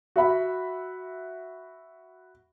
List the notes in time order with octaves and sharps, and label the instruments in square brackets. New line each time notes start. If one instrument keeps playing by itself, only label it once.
[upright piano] F#4 E5 B5